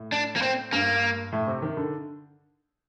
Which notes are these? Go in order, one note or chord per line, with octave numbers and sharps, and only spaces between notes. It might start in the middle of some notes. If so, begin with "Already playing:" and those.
Already playing: A2
D4
A#3
C4
G2 A#3
A2
C3
D#3
D3